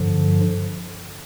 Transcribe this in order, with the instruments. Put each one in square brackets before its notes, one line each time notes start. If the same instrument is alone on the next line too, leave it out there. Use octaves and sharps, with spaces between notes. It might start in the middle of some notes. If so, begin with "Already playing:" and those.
Already playing: [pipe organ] G2 D3 F3